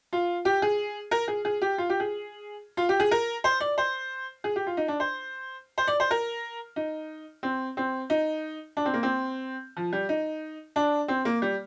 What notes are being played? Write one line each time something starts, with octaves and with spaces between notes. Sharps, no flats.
F4
G4
G#4
A#4
G#4
G#4
G4
F4
G4
G#4
F4
G4
G#4
A#4
C5
D5
C5
G#4
G4
F4
D#4
D4
C5
C5
D5
C5
A#4
D#4
C4
C4
D#4
D4
C4
A#3
C4
F3
G3
D#4
D4
C4
A#3
G3